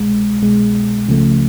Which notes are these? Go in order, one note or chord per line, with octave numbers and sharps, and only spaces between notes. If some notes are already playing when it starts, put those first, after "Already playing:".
Already playing: C2 B2 G#3
C2 B2 G#3
C#2 C#3 F3 A3